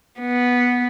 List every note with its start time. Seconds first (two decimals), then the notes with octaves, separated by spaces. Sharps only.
0.20 B3